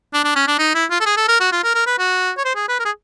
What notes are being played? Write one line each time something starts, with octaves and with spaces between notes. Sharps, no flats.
D4
D4
C#4
D4
D#4
E4
F4
A4
G#4
A4
A#4
F#4
F4
A#4
A#4
B4
F#4
C#5
C5
G#4
B4
A#4
G#4